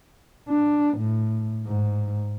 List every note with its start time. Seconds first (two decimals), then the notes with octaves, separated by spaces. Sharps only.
0.50 D4
0.98 A2
1.66 G#2